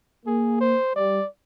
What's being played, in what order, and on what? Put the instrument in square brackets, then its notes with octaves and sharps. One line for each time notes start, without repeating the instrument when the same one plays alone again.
[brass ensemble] A#3 [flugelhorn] G#4
[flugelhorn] C5
[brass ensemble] G3 [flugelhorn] D5